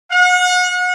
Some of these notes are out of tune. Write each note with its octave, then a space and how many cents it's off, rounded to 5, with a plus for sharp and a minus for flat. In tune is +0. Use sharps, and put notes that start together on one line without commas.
F#5 -35